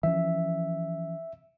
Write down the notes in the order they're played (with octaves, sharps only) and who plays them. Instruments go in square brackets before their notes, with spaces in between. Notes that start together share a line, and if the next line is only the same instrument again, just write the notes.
[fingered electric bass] E3 F3 C#4 [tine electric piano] E5